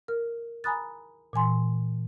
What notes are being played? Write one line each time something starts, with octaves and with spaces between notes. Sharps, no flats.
A#4 F6
G#5 A#5 B5 D#6 F#6 A6
A#2 E3 G#5 C6